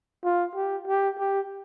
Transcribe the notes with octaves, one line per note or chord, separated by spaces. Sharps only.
F4
G4
G4
G4